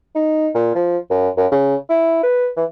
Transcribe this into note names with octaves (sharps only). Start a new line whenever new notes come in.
D#4
A#2
F3
F#2
F#2
C#3
E4
B4
E3